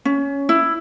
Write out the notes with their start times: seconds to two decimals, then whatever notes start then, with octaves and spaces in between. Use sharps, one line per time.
0.05 C#4
0.49 E4